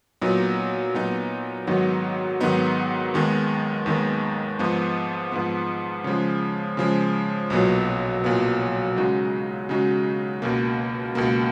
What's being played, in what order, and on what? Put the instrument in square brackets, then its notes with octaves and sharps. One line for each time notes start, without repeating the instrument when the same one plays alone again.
[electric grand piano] A#2 F#3 B3 D#4
A#2 F#3 B3 D#4
G#2 D#3 F#3 B3 D#4
G#2 D#3 F#3 B3 D#4
D#2 D#3 G#3 B3
D#2 D#3 G#3 B3
G#2 F3 B3
G#2 F3 B3
C#3 F3 G#3
C#3 F3 G#3
B1 A#2 F#3 B3
B1 A#2 F#3 B3
C#3 G#3 D#4 F#4
C#3 G#3 D#4 F#4
C#2 B2 A#3
C#2 B2 A#3